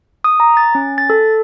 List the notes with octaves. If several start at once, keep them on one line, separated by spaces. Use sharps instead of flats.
D#6
A#5
A6
C#4
A6
A4